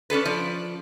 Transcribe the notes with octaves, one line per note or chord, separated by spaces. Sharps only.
C#4 D4 A4 B4
F3 D5